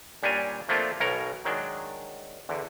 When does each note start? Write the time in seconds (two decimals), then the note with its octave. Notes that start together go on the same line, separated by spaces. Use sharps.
0.23 A#2 G3 C#4 D4 G#5 A#5
0.69 F3 A3 A#3 C4 D4 F4
1.00 B1 B2 A#4 C#5 A#5
1.45 D#3 F#3 G#3 D4
2.49 E2 D3